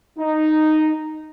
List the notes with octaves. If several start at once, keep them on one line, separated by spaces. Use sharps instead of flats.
D#4